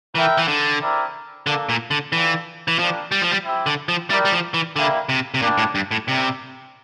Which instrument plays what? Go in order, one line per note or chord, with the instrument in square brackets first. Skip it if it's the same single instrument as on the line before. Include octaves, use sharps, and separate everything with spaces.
[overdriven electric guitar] E3 [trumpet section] E4 A#4 E5 G5
[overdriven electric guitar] E3
D3
[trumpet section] C4 E4 A#4 D5
[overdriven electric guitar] D3 [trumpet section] A#3 D4 A4
[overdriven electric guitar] A#2
D3
[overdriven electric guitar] E3 [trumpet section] F4 A4 D5 G5
[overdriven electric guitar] E3
[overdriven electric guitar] F3 [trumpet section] G3 A#3 D4
[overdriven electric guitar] G3
F3
G3
[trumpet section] C4 E4 G4
[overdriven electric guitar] D3
F3
[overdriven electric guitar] G3 [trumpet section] E4 A#4 D5 G5
[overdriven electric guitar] G3
F3
E3
[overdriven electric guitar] D3 [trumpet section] G3 A#3 E4
[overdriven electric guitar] C3
C3
[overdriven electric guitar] A#2 [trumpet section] G3 A#3 D4
[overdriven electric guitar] A2
G2
A2
[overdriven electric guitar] C3 [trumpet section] C4 E4 A#4 D5